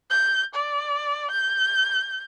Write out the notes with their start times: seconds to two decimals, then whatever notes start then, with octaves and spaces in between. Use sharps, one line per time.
0.11 G6
0.54 D5
1.31 G6